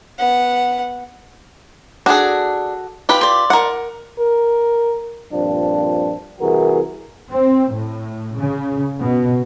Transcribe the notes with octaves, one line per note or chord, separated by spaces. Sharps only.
B3 F#5
D4 F#4 G#4 A4
F4 G4 B4
D5 C6
A#4 F#5
A#4
G2 A#2 F3 C4 D4
C2 E3 F#4 G#4 A#4
C4
A2
C#3
B2